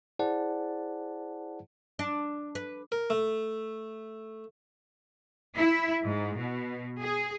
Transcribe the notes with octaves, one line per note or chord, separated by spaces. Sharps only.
E4 G#4 C5 D5 F#5 A5
D4
B4
A#4
A3
E4
G#2
B2
G#4